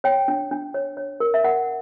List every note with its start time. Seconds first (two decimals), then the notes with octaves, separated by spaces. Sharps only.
0.04 C#5 G5
0.28 D4
0.51 D4
0.74 C#5
0.97 C#5
1.20 A#4
1.34 E5
1.44 A#4 F#5